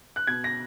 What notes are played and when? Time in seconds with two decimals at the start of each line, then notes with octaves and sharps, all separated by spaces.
0.16 F#6
0.27 B2 G#6
0.44 A#6